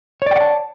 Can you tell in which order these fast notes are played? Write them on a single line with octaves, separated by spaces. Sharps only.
C#5 D5 G5 F#5 A5